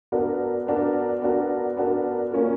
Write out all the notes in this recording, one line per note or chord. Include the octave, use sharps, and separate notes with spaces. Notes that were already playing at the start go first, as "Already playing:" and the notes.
B3 D4 F#4 A#4
B3 D4 F#4 A#4
B3 D4 F#4 A#4
B3 D4 F#4 A#4
A#3 C#4 F4 A#4